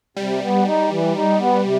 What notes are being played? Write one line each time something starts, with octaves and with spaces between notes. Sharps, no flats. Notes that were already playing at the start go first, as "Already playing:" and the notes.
C3 G3
B3
D#4
E3
D#4
B3
C3